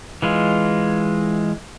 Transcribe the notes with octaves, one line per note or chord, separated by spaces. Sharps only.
E3 G#3 F4